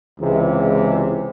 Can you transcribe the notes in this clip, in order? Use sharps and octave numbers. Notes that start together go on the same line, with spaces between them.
C#2 C3 E3 G#3